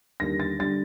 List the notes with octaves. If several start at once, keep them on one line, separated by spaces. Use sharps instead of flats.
D#2 D3 G3 A#6
A6
D3 G3 A6